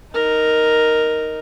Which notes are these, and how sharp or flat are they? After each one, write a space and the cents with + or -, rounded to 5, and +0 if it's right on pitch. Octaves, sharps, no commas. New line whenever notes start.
D#4 +0 A#4 +0